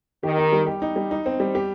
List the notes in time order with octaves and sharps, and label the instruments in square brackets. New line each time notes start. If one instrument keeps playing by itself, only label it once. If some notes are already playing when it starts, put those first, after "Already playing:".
[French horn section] D#3 [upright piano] G4
[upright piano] D#4
G3
G4
D#4
G3
D#4
C4
G3
G4